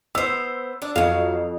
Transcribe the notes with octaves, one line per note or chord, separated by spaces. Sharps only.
B3 C5 E6
D4
F2 F#3 F5